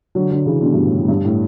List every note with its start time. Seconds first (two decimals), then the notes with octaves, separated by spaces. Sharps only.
0.15 D3 F#3
0.31 D3 F#3
0.46 C#3 E3
0.62 B2 D3
0.73 G2 B2
0.85 A2
0.97 A2
1.08 G2
1.24 A2